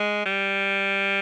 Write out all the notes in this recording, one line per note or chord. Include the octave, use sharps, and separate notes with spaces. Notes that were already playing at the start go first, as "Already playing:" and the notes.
Already playing: G#3
G3